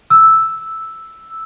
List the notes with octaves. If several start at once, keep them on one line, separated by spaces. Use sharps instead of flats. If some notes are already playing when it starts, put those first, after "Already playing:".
E6